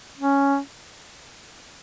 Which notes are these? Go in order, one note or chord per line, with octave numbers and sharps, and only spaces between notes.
C#4